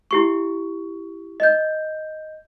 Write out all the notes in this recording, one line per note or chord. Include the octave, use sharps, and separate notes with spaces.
E4 G4 C#6
D#5 G6